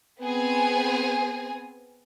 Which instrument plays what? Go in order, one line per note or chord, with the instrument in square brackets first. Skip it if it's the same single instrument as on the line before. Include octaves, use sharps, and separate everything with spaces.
[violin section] B3 C4 G#4 G#5